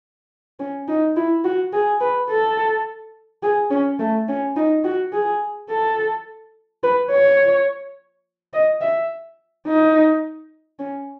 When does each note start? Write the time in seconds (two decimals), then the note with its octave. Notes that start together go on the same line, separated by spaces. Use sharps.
0.59 C#4
0.88 D#4
1.16 E4
1.44 F#4
1.73 G#4
2.00 B4
2.30 A4
3.43 G#4
3.71 C#4
4.00 A3
4.28 C#4
4.56 D#4
4.84 F#4
5.13 G#4
5.69 A4
6.83 B4
7.11 C#5
8.53 D#5
8.81 E5
9.66 D#4
10.79 C#4